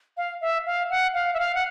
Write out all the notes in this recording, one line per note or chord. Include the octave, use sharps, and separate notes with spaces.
F5
E5
F5
F#5
F5
E5
F5
F#5